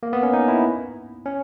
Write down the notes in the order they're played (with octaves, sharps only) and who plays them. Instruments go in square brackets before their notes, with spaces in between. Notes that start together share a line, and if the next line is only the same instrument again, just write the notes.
[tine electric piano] A#3
B3
C#4
D#4
E4
C#4